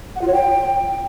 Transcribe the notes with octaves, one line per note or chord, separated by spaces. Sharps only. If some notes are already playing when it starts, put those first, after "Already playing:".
F#5
F4
C#5
G5